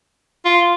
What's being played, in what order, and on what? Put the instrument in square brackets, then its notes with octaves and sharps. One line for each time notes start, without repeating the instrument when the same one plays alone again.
[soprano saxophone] F4